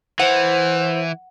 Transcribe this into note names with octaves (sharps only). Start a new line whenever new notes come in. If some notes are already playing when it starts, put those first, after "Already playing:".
E3 C5 F#5